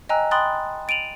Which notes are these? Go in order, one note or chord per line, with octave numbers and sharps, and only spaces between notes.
D#5 G5 G#5 A#5 E6 F#6
G5 B5 C6 D#6 F#6 A6
A6 D7 D#7 F7 F#7